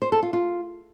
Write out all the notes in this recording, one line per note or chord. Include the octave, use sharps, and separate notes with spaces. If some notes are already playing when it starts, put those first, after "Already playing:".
C5
A4
F4
F4